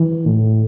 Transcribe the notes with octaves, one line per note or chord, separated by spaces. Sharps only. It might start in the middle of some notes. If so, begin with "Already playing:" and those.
Already playing: E3
A2